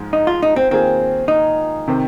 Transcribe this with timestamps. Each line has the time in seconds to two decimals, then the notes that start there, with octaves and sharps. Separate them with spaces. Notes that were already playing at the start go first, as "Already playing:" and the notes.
Already playing: G#2 F3 G#3 F4
0.13 D#4
0.27 F4
0.42 D#4
0.56 C4
0.71 D#3 A#3 C4 F4 G#4
1.28 D#4
1.87 C3 D#3 C4